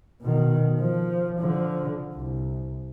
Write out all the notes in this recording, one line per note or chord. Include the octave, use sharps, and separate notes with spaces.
B2 D#3
F3
D3 F3
C2